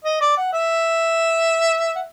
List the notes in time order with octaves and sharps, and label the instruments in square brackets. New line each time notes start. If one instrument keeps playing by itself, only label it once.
[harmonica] D#5
D5
F#5
E5
F#5